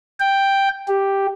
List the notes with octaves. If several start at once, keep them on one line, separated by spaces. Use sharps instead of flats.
G5
G4